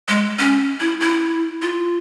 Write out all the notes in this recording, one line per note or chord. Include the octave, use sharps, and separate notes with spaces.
G#3
C#4
E4
E4
F4